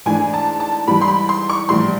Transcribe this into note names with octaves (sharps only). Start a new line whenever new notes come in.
G#2 E3 A3 D4 G#5
A5
A5
G#2 E3 G3 B5
C6
B5
C6
C#6
A#1 A2 E3 G3 C6